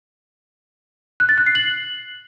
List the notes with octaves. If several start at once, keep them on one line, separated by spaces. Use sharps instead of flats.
F#6
A6
F#6
C7
F#7